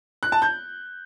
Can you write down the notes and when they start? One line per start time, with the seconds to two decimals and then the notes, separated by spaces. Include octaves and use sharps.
0.23 F#6
0.32 A5
0.42 G6